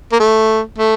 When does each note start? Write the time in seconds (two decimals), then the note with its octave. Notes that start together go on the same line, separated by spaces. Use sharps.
0.12 A#3
0.20 A3
0.78 A3